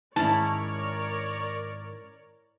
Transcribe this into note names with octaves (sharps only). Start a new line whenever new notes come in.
G#2 D#3 C#4 E4 A#4 C#5 D5 A5